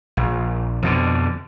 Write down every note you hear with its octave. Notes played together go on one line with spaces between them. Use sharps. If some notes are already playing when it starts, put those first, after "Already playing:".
A#1
F2 B2 D3